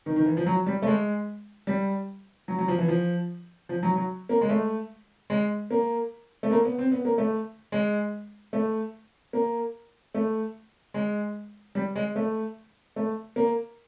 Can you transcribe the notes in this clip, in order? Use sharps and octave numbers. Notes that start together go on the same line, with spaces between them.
D#3
D#3
E3
F3
F#3
G3
A3
G#3
G3
F#3
F#3
F3
E3
F3
F3
F#3
F#3
A#3
G#3
A3
G#3
A#3
A3
A#3
B3
C4
B3
A#3
A3
G#3
A3
A#3
A3
G#3
G3
G#3
A3
A3
A#3